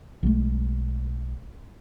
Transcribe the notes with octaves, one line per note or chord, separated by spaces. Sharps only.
B1 B2 G#3 A3